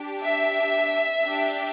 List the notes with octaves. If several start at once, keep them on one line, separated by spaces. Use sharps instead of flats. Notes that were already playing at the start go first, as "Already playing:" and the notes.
Already playing: D4 G4
E5
D4 G4